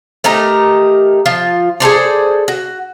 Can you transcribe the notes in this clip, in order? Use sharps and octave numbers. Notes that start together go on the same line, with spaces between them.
A3 D#4 G4 A#4
F3 F4
G#4 A4 C5 D5
F#4